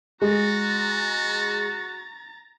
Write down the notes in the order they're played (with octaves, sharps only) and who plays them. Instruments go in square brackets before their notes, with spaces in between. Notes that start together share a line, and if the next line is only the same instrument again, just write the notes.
[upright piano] G#3 [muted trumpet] F#4 [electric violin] A#5 A6